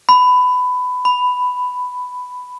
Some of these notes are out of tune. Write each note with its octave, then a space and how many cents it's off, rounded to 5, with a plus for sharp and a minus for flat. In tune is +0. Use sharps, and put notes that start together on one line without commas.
B5 +20
B5 +10